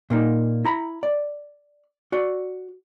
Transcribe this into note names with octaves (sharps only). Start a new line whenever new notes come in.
A#2 A#3 D#4
E4 A#5 B5
D5
F#4 D5